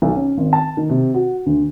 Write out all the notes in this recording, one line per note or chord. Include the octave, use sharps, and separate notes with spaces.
B1
C#4
G#1
A5
D#3
C3
F#4
D2